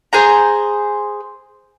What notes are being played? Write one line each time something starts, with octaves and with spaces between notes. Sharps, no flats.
G#4 C5 A#5